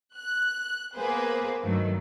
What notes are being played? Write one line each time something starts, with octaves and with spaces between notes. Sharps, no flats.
F#6
A#3 B3 G#4 B4 C5
G2 D#3 F#3 A3